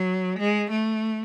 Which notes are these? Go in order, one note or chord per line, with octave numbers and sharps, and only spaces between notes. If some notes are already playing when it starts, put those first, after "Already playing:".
Already playing: F#3
G#3
A3